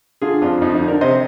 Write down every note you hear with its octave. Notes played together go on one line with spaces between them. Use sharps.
D3 F4 G#4
F2 D4 F4
F2 D#4
D#4
D3
A#4 D5
C3 C5 D#5